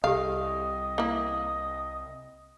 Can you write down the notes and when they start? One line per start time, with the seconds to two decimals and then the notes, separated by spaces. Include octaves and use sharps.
0.04 C2 G4 A4 D#5 F5
0.98 A#3 E4